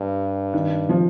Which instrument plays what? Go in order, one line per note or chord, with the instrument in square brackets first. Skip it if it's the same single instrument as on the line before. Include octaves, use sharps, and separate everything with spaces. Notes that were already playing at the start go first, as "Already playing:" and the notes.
Already playing: [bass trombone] G2
[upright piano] D#3
F3